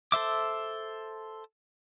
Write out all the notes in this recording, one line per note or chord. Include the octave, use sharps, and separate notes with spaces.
A4 C5 E5 D6